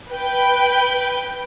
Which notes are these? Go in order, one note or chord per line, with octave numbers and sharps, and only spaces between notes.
B4 G5